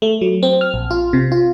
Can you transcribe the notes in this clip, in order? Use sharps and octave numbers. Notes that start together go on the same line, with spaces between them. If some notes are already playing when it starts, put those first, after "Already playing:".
A3
F#3
C4
F6
A#1
F4
C3
F4